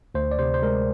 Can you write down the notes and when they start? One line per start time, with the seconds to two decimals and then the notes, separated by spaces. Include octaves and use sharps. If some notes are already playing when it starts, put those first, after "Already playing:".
0.15 D2 C5
0.31 D5
0.39 C3 C5
0.54 C5
0.62 G#3 A#4